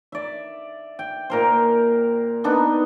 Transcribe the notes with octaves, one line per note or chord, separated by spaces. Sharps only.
D5 E5
G5
A#2 A#4 C5
B3 D4 D#4